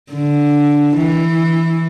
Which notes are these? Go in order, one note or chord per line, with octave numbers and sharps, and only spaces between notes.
D3
E3